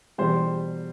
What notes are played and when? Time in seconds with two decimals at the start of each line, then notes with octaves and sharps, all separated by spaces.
0.18 E2 B2 G3 C5